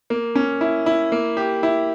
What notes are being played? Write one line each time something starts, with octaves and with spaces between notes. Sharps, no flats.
A#3
C#4
E4
E4
A#3
G4
E4